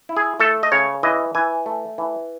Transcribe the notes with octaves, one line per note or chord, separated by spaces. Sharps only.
E4
G#4
A3 A4
D#5
C#3 C#5
E3 D#5
E3 G#5
A3
E3